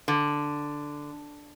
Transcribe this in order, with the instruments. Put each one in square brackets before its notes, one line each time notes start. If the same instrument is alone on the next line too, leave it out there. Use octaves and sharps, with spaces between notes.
[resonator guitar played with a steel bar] D3